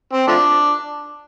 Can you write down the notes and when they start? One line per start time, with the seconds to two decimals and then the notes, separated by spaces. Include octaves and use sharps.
0.13 C4
0.28 F3 A3 D4